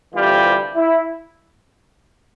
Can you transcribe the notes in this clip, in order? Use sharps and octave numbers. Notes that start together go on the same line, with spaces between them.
D2 C3 E3 G3 F4
E4